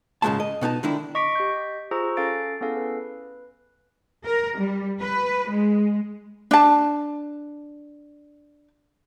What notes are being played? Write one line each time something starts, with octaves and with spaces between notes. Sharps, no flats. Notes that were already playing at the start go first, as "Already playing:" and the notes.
G#2 C#3 E3 G#3 A#3 A5
D#5
B2 B3 D#4 A5
D3 D#3 D4 E4
D#5 C#6 D6 B6 D7
G4 D#5 G6
F4 G#4 C5 A#5 C#6 E6
C#4 A4 F5 A6 D7
B3 C#4 E4 G#4 A4 F5
B4
A#4
G3
B4
G#3
D4 A5